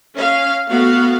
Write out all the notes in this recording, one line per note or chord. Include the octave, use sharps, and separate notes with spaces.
C#4 F5
A3 B3 F#4 F5